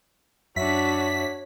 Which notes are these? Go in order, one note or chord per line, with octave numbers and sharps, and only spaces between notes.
F#2 D4 F#4 C#5 E5 B6